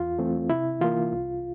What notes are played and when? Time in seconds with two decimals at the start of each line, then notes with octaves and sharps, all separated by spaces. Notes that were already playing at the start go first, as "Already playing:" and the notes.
Already playing: E2 F4
0.19 E3 A3 C4
0.50 C3 E4
0.81 E3 A#3 F4
1.13 C2